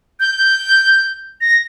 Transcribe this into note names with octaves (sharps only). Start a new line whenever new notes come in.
G6
A#6